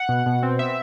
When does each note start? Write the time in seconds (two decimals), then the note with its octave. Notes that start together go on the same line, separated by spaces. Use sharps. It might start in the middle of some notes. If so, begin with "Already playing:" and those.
Already playing: F#5
0.09 B2
0.26 B2
0.43 C4
0.59 B3 E5